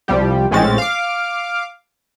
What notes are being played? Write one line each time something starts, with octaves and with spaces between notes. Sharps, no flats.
C2 F3 G3 G4
A#1 A2 G#3 C4 C#4 A6
F5 D6